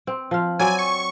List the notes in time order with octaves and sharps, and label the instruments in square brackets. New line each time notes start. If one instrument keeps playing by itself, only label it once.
[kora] C4
F3 F5
[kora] F#3 C4 D5 [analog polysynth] G#5
[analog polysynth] C#6